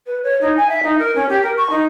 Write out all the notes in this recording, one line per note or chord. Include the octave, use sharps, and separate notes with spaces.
B4
C#5
D#4
G#5
E5
D#4
A#4
C#4
G4
A#4
C#6
D#4